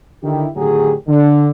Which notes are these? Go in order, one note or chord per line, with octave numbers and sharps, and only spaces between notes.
D3 D#3 E4 G4
A2 D3 D#3 F#3 G4 G#4
D3